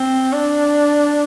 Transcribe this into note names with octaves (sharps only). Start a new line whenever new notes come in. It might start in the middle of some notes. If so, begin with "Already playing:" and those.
Already playing: C4
D4